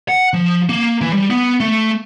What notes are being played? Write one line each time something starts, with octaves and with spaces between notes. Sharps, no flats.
F#5
F3
A#3
E3
G3
B3
A3